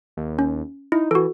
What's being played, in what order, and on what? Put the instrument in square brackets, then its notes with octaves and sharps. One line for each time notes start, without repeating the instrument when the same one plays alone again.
[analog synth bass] D#2
[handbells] C#4
[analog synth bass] D#4 [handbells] E4
[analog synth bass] E3 [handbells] F#4 A4